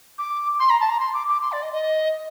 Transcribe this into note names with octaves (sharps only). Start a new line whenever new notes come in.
D6
C6
A#5
A5
A#5
C6
D6
D6
C6
D5
D#5
D#5